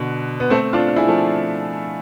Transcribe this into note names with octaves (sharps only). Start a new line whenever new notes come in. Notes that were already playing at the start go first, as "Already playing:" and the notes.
Already playing: B2 D3
B3
A3 C4
D4 F4
F4
E4 G#4
F3 A3